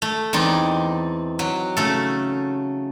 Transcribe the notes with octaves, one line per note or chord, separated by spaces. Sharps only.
A3
E2 C4 D#4 D5
F#3
C#3 A3 A4